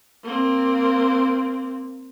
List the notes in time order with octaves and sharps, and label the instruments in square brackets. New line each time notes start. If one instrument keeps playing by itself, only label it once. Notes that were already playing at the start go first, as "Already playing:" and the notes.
[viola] A#3 C4